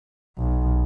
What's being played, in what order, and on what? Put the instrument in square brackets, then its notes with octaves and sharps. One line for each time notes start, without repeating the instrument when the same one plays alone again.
[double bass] B1